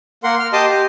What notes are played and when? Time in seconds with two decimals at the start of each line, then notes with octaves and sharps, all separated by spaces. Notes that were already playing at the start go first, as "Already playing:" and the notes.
0.24 A#3 A#4 F#5 C6
0.40 F6
0.53 G4 D#5 A5 C6 D6 D#6
0.68 G4